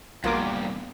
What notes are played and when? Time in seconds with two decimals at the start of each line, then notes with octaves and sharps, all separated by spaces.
0.24 A#1 E2 G2 A#3 F4 F#4 D6